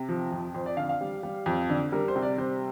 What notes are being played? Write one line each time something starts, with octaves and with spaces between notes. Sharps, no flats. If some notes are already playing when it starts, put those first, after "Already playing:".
Already playing: C3
F3
F2
F2 C5
D5
D3 F5
F5
G3
G3
F2
D3
G3 A#4
C5
C3
D5
G3 C5